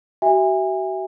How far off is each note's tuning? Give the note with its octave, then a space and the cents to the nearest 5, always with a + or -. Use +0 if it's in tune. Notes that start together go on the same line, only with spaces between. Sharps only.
F#4 +45 E5 +0 G#5 -30